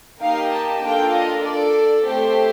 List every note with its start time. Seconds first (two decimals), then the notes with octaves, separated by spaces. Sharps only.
0.20 A#3 D#4 G4 F5
0.51 A5
0.82 A#3 D4 F4 A4 G5
1.12 D#5
1.42 D4 A4 D5
2.04 A3 C4 G4 C5